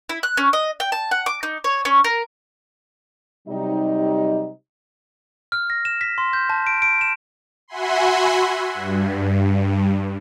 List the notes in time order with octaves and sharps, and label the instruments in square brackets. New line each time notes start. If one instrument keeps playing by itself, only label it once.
[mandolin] E4
F#6
C#4
D#5
G5
A5
F#5
D6
D#4
C#5
C#4
A#4
[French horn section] C3 F#3 G3 D#4
[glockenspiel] F6
A#6
E7
B6
C6
G6
A5
D7
D7
E7
[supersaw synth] F#4 E5 F#5 G#5 B5 C6
G2